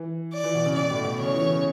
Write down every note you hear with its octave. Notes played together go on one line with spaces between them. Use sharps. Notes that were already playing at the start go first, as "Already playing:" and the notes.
Already playing: E3
D5
E3
B2
C#3
B2 D5
A2
B2
C#3 C#5
E3
C#3